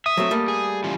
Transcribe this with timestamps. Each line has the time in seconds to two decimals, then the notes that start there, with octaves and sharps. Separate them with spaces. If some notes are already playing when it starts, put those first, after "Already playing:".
0.06 E5 D#6
0.17 F#3 A3 C4
0.31 G3 A3 A#3
0.48 G#4
0.84 E3 C#4 F4